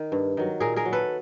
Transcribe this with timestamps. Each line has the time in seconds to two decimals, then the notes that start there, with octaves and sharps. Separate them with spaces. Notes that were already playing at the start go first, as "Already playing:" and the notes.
Already playing: D#3
0.12 G2
0.37 D#3 F#3
0.60 A#2 G#4 A#4
0.76 G#4 A#4
0.85 F#3
0.92 A4 B4